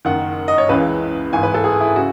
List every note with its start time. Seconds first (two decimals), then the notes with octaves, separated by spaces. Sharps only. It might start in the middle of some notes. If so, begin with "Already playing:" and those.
0.05 F#1 F#2 D#3 F#5
0.48 D#5
0.58 C#5
0.69 C#2 C#3 E3 B4
1.33 G#1 G#2 E3 G#5
1.43 B4
1.54 A4
1.64 G#4
1.80 E4
1.96 C#3 F#4